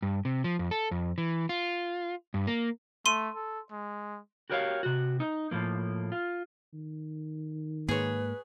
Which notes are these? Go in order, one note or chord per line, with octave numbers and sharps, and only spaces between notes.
G2
C3
F3
F2
A4
F2
E3
F4
G2
A#3
A3 C6 D#7
A4
G#3
F#4 G4 A#4 C#5 D5 F5
C3 F#4
D#4
A2 F3 A#3
F4
D#3
G#2 A#3 G#4 B4 C#5